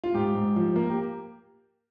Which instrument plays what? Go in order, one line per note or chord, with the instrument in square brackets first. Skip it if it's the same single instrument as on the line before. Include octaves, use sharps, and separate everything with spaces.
[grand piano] F4
G#2 G4
G#2
F3
A#3
G4